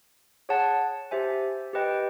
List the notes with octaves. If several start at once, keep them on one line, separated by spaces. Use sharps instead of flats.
G#4 C#5 F#5 A5
G4 C5 E5 G#5
G4 B4 D#5 G5